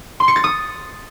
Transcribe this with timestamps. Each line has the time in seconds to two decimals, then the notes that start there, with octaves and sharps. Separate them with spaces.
0.20 C6
0.28 C#7
0.36 A6
0.44 D#6